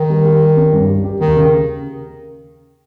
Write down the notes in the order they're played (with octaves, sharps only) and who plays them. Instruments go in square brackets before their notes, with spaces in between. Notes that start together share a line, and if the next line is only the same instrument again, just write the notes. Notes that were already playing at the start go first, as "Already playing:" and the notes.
Already playing: [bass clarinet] D#3
[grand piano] G3
G3
G4
C#4
G2
G4
G4
[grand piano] D#2 [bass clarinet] D#3
[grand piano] C#3